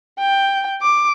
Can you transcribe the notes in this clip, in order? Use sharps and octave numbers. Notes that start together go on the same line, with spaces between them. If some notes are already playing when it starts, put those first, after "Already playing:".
G5
D6